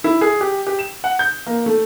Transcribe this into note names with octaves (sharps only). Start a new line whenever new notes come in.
E4
G#4
G4
G4
E7
F#5
G6
A#3
A3